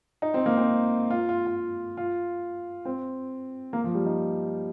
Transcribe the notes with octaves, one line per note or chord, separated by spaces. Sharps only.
D#4
C4
A#3
C4
F4
F4
F4
F4
C4
A#3
F3
G3
D#4